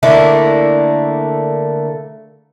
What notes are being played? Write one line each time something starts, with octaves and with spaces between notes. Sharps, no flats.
D3 A3 A#3 E4